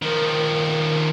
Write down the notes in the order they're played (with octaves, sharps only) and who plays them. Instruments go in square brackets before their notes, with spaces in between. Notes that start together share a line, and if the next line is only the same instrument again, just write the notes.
[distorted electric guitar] D#3 F3 [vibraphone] A#4